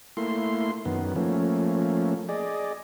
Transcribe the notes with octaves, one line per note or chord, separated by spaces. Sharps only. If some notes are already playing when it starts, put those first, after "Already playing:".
A3 A#3 E4 C6
F#2 D#3 B3
F3 A3 A#3 C#4
G#4 D5 D#5